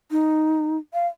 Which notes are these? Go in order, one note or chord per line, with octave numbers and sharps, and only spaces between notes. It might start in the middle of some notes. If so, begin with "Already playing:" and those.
D#4
F5